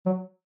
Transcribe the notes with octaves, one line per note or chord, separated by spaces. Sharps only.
F#3